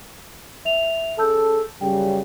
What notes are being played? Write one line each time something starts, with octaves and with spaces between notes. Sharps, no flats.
E5 F7
C#4 G#4 A4 A5 E6 G6
F#2 C#3 G3 G5